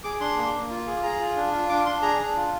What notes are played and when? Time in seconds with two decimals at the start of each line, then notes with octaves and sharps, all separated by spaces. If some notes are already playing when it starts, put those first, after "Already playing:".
0.04 G#4 D6
0.20 D4 C6
0.37 A#3
0.54 A#3
0.70 F4
0.87 G#4
1.03 G#4 A#5
1.20 F4
1.37 D4
1.53 F4
1.69 D4 D6
1.86 D4 C6
2.02 G#4 A#5
2.19 D4
2.36 F4